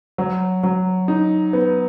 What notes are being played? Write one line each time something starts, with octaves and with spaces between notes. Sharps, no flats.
F#3
F#3
D#4
B3